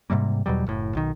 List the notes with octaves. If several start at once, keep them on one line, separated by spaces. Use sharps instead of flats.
G#2 C3 G3 A#3
E2 B2 F#3 G3
F#1 A2
B1 D#3